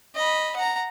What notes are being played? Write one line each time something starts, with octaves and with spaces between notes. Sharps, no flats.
D#5 B5
F#5 A#5